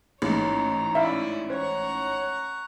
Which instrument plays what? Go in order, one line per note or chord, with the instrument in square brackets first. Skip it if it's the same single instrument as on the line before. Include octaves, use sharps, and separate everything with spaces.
[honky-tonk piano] A1 G#2 [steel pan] A#3 [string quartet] C#5 [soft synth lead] A#5
[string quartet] C#4 E4 D5 [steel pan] E5 F5 B5
[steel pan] C5 [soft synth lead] C#5 [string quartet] F#5 A#5 C#6